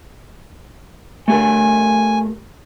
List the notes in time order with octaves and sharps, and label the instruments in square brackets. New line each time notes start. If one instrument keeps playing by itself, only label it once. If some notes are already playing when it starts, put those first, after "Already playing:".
[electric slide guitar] A3 G4 A#4 [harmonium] G#5